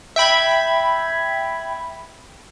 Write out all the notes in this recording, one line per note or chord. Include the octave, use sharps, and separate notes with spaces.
E5 G5 B5 G#6